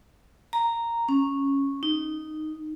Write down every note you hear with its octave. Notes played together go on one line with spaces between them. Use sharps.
A#5
C#4
D#4